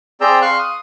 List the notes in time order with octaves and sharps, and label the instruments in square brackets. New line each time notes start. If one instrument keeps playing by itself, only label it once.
[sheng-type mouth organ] C4 G#4 D5 G5 A#5 E6
F5 C6 C#6 F#6
D#6